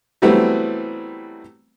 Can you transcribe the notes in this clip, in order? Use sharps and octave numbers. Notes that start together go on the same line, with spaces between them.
E3 F#3 G3 A3 B3 C4